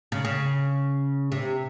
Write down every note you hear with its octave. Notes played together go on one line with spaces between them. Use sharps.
C#3
C#3
C3